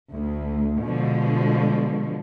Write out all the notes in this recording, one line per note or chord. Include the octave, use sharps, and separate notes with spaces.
D2
B2 D3 F3 G#3